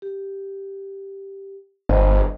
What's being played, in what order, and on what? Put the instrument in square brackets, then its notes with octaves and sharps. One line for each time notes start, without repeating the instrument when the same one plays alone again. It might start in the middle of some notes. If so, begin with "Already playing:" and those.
[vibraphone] G4
[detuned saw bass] G1 [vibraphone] C5 D#5